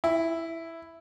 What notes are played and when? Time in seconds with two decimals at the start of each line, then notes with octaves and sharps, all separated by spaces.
0.04 E4